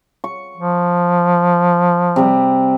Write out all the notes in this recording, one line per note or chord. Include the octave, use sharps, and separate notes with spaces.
C#6
F3
C3 G3